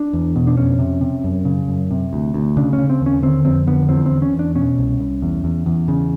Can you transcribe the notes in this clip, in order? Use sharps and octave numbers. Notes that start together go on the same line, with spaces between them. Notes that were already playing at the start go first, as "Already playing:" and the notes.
Already playing: D4
E2
B2
D4
F2 C#4
C3
C3
F#2
C#3
F#2
C3
D2
D2
C#3 D4
C#4
C#3
C4
D#2
C#4
D3 C4
F2 C4
D3 B3
E2 C4
C4
E2
C#4
E2
D4
B2 C#4
C2
C2
E2
E2
E2
C#3